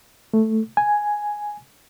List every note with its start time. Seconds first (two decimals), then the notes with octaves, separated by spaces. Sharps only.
0.34 A3
0.77 G#5